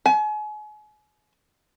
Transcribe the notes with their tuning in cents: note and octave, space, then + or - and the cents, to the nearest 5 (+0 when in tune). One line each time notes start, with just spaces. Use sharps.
G#5 +35